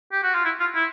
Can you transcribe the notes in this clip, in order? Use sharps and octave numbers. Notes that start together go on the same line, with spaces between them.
G4
F#4
F4
E4
F4
E4